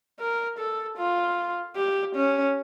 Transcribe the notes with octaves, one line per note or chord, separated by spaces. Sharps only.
A#4
A4
F4
G4
C#4